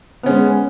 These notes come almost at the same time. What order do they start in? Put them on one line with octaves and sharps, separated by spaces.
B3 C#4 G#3